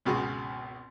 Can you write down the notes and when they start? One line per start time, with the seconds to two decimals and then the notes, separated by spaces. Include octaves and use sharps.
0.05 G#1 C#2 B2 F#4 G#4 C#6